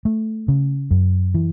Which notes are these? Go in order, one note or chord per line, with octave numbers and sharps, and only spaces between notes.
A3
C#3
F#2
E3